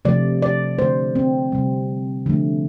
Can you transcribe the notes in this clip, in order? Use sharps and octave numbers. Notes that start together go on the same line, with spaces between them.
C3 F3 A3 D5
D5
D3 A3 C5
C4
C3 G3
D3 F3 A3